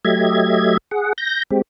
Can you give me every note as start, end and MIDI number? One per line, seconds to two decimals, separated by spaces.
0.05 0.77 54
0.05 0.77 57
0.05 0.77 67
0.05 0.77 75
0.05 0.77 76
0.05 0.77 92
0.91 1.13 68
0.91 1.13 78
1.18 1.43 91
1.18 1.43 94
1.51 1.62 56
1.51 1.62 60
1.51 1.62 67